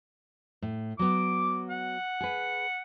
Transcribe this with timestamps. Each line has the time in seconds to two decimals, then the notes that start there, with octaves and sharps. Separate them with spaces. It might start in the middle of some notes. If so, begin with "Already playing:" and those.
0.62 A2
0.99 F#3 B3 D6
1.70 F#5
2.21 G#4 B4